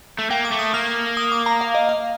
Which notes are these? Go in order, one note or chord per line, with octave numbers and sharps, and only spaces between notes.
A3
A#3 G5
D6
A3
D#6
A#3 F6
D#6
D6
A#5
F5
D#5
F5